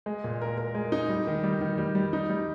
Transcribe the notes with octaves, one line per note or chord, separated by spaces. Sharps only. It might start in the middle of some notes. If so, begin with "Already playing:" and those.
G#3
A#2
A#4
A#4
G#3
D#4
G3
D#3
G3
D#3
G3
G3
D#4
G3